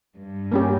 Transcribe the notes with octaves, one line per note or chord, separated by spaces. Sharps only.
G2
A#3 C#4 G4